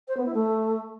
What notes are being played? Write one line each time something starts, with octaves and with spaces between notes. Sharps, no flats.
C5
B3
E4
A3